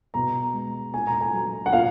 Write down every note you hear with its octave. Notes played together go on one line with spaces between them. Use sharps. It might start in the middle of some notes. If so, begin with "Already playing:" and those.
B2 A#5
G#3
A#2 G#5
A#5
G#5
F#3
F#5
A#2 F5